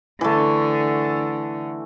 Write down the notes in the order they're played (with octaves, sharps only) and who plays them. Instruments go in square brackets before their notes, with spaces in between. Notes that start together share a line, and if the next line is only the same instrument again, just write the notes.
[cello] D3 [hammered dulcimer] E3 A3